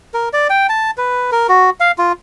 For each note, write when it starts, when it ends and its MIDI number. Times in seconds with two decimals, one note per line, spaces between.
0.14 0.29 70
0.33 0.48 74
0.50 0.67 79
0.69 0.91 81
0.98 1.30 71
1.32 1.47 70
1.49 1.70 66
1.80 1.92 77
1.98 2.12 65